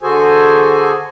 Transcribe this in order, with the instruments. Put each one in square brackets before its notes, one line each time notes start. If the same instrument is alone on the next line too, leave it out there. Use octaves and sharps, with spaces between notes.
[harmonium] D3 F#4 G#4 A4 C5 G#5